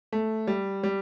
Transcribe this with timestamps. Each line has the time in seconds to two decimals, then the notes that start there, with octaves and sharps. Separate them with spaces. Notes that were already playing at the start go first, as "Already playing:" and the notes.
0.12 A3
0.47 G3
0.83 G3